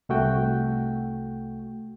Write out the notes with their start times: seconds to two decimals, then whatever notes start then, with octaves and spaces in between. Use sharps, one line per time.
0.09 C2 A3 F#4 G5